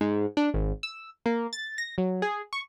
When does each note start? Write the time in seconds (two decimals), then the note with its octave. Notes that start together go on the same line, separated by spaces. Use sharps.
0.01 G#2
0.37 D4
0.54 G#1
0.83 E6
1.26 A#3
1.53 A6
1.78 A#6
1.98 F#3
2.22 G#4
2.53 C#6